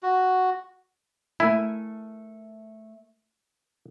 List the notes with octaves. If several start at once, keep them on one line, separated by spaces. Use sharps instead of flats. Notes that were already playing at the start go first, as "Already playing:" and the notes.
F#4
A3 E4 A#4 G#5